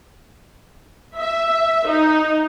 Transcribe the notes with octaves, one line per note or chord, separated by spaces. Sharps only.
E5
D#4